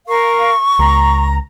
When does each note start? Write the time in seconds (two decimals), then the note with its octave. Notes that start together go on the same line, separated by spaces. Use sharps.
0.08 A#4 F5 C#6
0.79 C#2 A#5